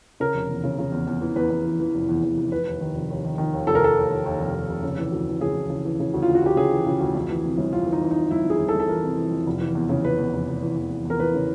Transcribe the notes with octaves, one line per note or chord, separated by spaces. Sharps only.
C#3 A#4
F1
E2
C#3
C#3
E2
E2
E3
E2 B4
E2
E3
E3
F1
E2
E2
F1
F1 B4
D#2
D#3
F1
D#2
D#3
D#3
D#2
F1 A4
A#4
F1 A4
D#2
D#2
D#2
F1
D#2
F1
C#3
E3
D2
E3
C#3 G#4
E3
C#3
E3
C#3
D2
F4
D2
F#4
D2 G4
C#3 G#4
E3
C#3
D2
F2
E3
C3
G1
F2 F4
E3
D#4
E3
D#4
E3
G1 E4
F2
G#4
G1
A4
G1
A4
E3 A#4
C3
E3
F2
F1
E3
E2
C#3
C#3 B4
E2
F1
F1
E3
E2
E3
E2
A#4
E3 B4
C#3